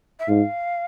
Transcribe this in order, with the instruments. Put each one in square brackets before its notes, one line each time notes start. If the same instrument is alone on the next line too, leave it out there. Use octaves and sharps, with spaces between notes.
[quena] E5
[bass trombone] G#2 [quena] F5